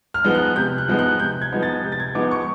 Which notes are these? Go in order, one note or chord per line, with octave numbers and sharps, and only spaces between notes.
F6
F3 G#3 B3 D#4
F#6
C3 G6
F#6
F3 G#3 B3 D#4
F#6
C3 G6
G#6
F3 G#3 B3 D#4
A6
C3 G6
A6
G#6
F3 G#3 B3 D#4 D6
C#6